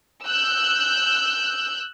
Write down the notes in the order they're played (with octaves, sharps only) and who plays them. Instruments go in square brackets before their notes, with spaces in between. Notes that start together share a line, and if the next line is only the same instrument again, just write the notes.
[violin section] E6 F#6 G6